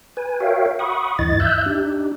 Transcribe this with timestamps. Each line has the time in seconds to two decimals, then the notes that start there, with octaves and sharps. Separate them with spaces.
0.17 B4 G#5
0.40 F#4 A#4 C#5 E5 F5 G5
0.79 F#5 B5 C#6 D#6
1.19 D2 G2 E3 E4 D#5 A6
1.40 E5 E6 F#6 G6
1.66 D4 D#4 G4